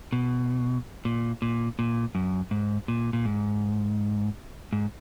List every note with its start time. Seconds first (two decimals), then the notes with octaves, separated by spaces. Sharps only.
0.12 B2
1.05 A#2
1.42 A#2
1.79 A#2
2.15 F#2
2.51 G#2
2.88 A#2
3.13 A#2
3.25 G#2
4.73 G#2